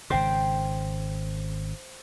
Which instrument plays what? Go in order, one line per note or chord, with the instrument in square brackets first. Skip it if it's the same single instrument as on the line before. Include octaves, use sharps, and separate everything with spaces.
[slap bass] G#1 C#3 [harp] C5 G5